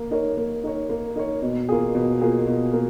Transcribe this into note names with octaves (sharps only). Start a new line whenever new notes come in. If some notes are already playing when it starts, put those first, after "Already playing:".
Already playing: A#3
D#4 A#4 C#5
A#3
D#4 A#4 C#5
A#3
D#4 A#4 C#5
B2
A#3 F4 G#4
B2
A#3 F4 G#4
B2
A#3